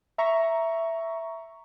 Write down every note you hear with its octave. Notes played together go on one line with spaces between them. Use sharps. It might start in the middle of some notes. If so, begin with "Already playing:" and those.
E5 A#5 C#6